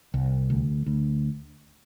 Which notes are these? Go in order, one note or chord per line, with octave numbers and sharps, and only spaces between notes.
C2
D2
D2